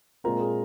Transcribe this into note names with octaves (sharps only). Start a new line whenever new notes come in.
A#2 G#3 C4 F4 A#4
G#4